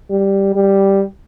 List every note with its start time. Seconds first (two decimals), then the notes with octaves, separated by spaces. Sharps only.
0.10 G3
0.55 G3